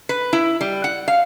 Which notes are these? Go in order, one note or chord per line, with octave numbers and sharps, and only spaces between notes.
B4
E4
G3
F#5
F5